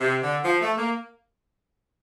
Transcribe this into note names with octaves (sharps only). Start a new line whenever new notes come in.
C3
D3
F3
A3
A#3